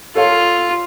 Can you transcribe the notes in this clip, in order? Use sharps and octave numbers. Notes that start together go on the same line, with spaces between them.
F4 A4 C#5 F5